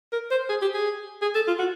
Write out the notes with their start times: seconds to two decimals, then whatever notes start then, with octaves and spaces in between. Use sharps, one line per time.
0.12 A#4
0.31 C5
0.50 G#4
0.62 G4
0.74 G#4
1.22 G#4
1.35 A4
1.47 F4
1.59 F#4